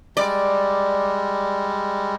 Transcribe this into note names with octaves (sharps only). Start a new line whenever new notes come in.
G3 G#3 D5